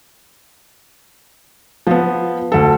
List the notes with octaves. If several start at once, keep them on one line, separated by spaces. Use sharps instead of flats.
F3 B3
D2 A4